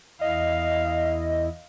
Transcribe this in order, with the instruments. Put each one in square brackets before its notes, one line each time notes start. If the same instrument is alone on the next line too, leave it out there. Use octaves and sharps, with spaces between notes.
[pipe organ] E2 E4 [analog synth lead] D#5 [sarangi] F5